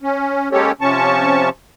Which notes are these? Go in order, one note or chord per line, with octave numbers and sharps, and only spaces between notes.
C#4
G#3 A#3 C#4 G4 A4 C#5
C3 F3 C#4 A5 C#6